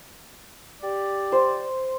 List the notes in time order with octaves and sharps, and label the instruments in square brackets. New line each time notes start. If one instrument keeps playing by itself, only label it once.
[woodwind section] G4 D5
[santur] C5